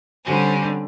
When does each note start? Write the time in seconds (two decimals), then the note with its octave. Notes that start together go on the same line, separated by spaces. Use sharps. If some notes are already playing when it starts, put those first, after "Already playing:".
0.23 D3 G3 C4 C#4